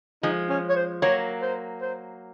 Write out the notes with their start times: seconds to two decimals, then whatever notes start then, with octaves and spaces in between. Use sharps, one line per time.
0.23 F3 G#3 D#4
0.50 C#4
0.69 C#5
0.76 C5
1.02 F#3 A#3 C#5
1.42 C5
1.81 C5